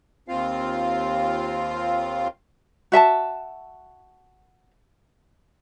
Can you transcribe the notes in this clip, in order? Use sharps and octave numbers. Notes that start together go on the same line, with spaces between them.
D#2 C4 F4 F5
F#4 E5 G#5 A5